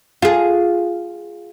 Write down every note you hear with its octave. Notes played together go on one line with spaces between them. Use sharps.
F4 G#4